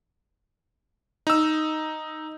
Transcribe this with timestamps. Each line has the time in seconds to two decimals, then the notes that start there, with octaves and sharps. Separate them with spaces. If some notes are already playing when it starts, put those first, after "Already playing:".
1.27 D#4 E6